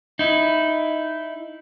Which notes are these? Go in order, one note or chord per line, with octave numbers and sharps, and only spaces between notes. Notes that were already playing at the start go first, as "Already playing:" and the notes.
D#4 E4